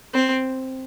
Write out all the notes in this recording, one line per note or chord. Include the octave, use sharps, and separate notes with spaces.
C4